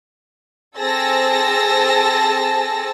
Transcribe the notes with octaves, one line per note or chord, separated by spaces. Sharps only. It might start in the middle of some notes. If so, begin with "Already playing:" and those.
C4 G#4 A4 A5 E6 A#6